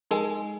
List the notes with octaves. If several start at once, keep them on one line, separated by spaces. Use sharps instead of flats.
G#3 D#4 A#4 G#5